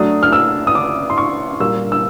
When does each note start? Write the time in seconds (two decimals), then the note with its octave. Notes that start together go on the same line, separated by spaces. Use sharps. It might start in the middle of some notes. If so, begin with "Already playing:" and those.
Already playing: F#3 A3 D4 D#6
0.23 F6
0.33 E6
0.67 D#6
0.75 D6
1.10 C6
1.18 C#6
1.60 A#2 G3 A#3 E6
1.92 E6